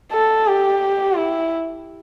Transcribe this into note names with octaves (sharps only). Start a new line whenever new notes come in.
A4
G4
E4